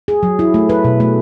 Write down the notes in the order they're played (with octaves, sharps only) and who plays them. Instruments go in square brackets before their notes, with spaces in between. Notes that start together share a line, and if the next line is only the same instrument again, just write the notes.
[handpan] G#4
F#3
E4
A3
B4
B2
A3